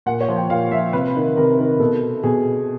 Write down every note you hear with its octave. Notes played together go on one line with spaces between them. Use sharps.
A#2 F#5
C#5
F3
G5
A#2 F5
F3 E5
C3 B4
D#3
C3 A#4
D#3
B2 A4
B2 G#4